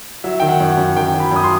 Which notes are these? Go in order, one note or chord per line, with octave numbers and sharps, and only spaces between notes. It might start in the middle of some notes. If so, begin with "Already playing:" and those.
F#3 E5
D#3 G5
F#5
F#2
F#5
F#2
D#3 G5
F#3
B5
F#2 D#6
C6